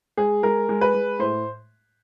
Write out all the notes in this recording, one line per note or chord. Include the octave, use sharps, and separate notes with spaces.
G#3 G#4
G#3 A#4
G#3
B4
G#3
A2 C5